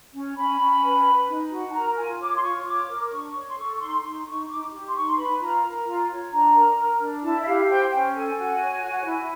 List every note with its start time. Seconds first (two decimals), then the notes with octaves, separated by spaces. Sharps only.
0.14 C#4
0.37 C#4 B5
0.60 C#4
0.83 B4
1.06 B4
1.28 D#4
1.51 F#4
1.70 A5
1.74 A#4 A#5
1.97 F4 G#5
2.20 C#5 D6
2.35 C6
2.42 F4 C#6
2.65 C#5 D6
2.89 A#4
3.11 D4 C#6
3.34 C#5
3.48 C6
3.57 A4 C#6
3.74 C#6
3.79 D#4 C6
4.03 D#4 C6
4.26 D#4 C#6
4.48 D#4 D6
4.72 G4
4.89 C6
4.94 D#4 C#6
5.09 C6
5.16 B4 B5
5.40 F4 A#5
5.62 A#4
5.85 F4
6.08 C#5
6.31 D4 A#5
6.54 A#4
6.77 A#4
7.00 D4
7.22 E4 A5
7.41 E5
7.45 G4 F5
7.68 C5 G5
7.91 C#4 G5
8.14 A4 G#5
8.37 F#4
8.60 C#5
8.82 F#4
9.06 E4